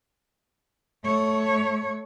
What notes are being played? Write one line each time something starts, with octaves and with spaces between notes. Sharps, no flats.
A3 C#5